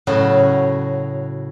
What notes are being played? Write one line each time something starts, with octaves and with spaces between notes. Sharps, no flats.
A2 C#3 F#3